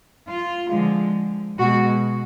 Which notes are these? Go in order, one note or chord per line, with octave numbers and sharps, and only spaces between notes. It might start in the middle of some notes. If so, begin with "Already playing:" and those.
F4
D3 F3 G#3
B2 G#3 F#4